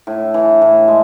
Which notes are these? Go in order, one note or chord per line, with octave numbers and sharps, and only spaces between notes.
A2
E3
A2
G#3